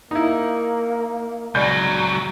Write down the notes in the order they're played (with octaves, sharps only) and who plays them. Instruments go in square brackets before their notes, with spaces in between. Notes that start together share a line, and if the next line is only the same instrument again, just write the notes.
[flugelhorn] A#3 [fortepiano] D#4 E4
[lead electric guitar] C#2 F#3 [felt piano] D5 B5 G6